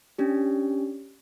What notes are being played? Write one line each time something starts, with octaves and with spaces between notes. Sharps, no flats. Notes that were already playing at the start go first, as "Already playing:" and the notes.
C#4 D4 G4